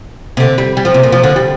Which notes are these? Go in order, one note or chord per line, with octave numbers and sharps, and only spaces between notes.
C3
D3
G3
G3
F3
C3
A#2
F3
D3
G3